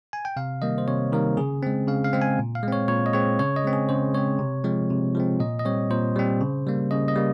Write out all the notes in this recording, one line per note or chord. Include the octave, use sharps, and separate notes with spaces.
G#5
G5
C3 F5
D#3 G3 A#3 D#5
C5
C3 C#5
D#3 G3 A#3 A#4
C#3 G#4
G#3 C4
C#3 F5
F5
G#3 C4
G#5
A#2
F5
G#3
C4 C#5
A#2 C#5
D#5
G#3 C4 C#5
C#3 C#5
D#5
G#3 C4
G#4
C#3 C5
G#3 C4 C#5
C3
F3 G#3 C4
C3
F3 G#3 C4
A#2 D#5
D#5
G3 C4 C#5
A#2 C5
G3 C4
C#3
G3 A#3
C#3 D#5
D#5
G3 A#3